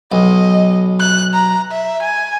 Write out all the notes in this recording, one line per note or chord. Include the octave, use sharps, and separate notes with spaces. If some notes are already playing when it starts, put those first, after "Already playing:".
B1 D#5
F#6
A#5
E5
G#5